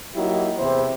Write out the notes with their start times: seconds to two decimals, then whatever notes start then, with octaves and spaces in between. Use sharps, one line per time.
0.15 F#3 A#3 D#4 E4 G4
0.58 E2 C3 E4 C5